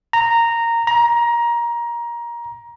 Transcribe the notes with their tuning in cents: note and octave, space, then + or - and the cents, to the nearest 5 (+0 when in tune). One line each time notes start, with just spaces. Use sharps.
A#5 -10
A#5 +20